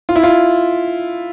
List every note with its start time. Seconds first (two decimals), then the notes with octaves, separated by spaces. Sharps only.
0.09 F4
0.16 E4
0.23 F4